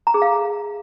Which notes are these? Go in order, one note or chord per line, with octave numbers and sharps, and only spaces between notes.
A#5
G#4
F5